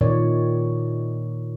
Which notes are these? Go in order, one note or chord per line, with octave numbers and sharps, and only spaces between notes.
A#2 D#3 C#5 D5